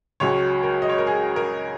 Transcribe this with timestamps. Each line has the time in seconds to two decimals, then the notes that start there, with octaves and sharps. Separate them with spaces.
0.20 C#2 C#3 F#3 C#5
0.63 A#4
0.82 D#5
0.89 C#5
0.98 A#4
1.07 G#4
1.36 A#4